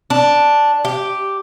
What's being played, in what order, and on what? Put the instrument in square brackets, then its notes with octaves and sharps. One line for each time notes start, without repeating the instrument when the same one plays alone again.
[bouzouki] D4
G4